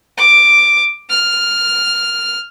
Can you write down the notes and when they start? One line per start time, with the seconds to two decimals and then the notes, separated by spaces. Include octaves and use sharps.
0.18 D6
1.10 F6